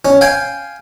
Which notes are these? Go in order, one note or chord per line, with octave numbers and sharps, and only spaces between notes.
C#4
F5 G5 G#5